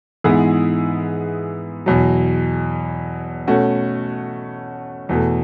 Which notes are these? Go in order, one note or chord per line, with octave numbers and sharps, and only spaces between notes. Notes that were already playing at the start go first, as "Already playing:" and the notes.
G#2 E3 B3 E4 G#4
E2 B2 F#3
B2 A3 C#4 F#4
E2 B2 A3